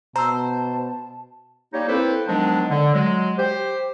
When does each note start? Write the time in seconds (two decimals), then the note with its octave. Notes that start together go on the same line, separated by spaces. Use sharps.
0.16 B2 C5 A5 A#5 E6
1.73 G3 A#3 D#4 G4 C#5
1.88 A#3 C4 E4 A4 B4 C5
2.28 D#3 F3 F#3 G#3 B3 D4
2.70 D3
2.94 F#3 G#3
3.38 G4 C5